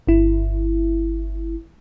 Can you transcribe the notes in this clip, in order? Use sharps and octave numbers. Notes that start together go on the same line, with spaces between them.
G1 E4